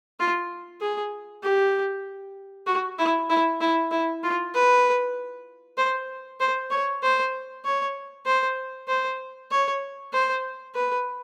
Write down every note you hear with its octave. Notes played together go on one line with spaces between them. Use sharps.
F4
G#4
G4
F#4
E4
E4
E4
E4
F4
B4
C5
C5
C#5
C5
C#5
C5
C5
C#5
C5
B4